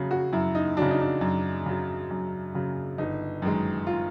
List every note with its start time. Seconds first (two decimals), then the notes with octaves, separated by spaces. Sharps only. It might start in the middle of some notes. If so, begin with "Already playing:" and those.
Already playing: F#2 C#3 F#3 G#4
0.11 F#4
0.33 F#2 E4
0.55 D#4
0.77 C#3 F#3 D4
0.91 D#4
1.00 D4
1.21 F#2
1.66 C#3 F#3
2.11 F#2
2.54 C#3 F#3
2.98 G1 D#4
3.42 F#2 D#3 G#3
3.87 F4